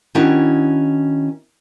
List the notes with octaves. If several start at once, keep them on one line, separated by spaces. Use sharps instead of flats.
D#3 C#4 D4 E4 F#4